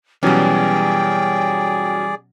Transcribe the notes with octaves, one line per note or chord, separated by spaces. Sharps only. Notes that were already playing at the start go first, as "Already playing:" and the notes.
B2 E3 F#3 G3 C#4 G#4 D5 G5